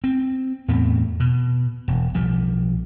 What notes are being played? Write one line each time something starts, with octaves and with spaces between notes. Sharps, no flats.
C4
E2 A2 B3 C4
B2
E1
B1 F3 G3